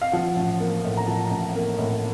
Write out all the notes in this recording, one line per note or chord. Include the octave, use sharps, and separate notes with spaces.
F5
F3 F#5
A1
A#3
A2
A#5
F3 A5
A1
A#3
A2